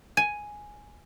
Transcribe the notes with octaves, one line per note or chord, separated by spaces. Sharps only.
G#5